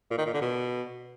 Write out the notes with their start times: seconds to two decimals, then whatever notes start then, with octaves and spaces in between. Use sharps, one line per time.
0.10 A#2
0.18 D#3
0.26 A#2
0.34 D3
0.41 B2